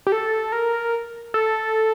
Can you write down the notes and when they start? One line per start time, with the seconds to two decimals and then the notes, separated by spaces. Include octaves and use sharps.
0.07 G4
0.12 A4
0.52 A#4
1.34 A4